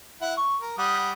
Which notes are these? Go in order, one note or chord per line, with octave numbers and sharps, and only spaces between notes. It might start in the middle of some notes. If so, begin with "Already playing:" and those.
E4 F#5
C#6
A#4
G3 F#5 D#6